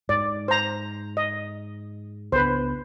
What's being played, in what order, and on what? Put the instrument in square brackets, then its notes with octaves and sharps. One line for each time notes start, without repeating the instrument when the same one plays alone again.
[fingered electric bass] G#2 [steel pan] D5
[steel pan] C5 A#5
D#5
[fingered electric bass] C#2 B3 D4 [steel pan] B4 C5